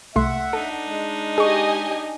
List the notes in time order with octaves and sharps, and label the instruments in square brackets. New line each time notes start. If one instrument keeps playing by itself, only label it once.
[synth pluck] C2 A3 C6 [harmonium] E5 F#5
[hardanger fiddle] D4 D#4 [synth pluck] A4
[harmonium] G#3
[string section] G4 D#5 G#5 [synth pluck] G#4 C#6